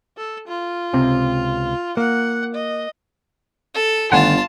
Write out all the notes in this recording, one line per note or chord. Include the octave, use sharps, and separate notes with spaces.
A4
F4
C#2 C3 C4
A#3 F#5
D#5
A4
G1 D3 D#3 A3 F4 F#5 G#5 A5